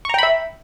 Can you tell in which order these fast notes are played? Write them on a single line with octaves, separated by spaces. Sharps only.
C#6 A#5 G5 B5 E5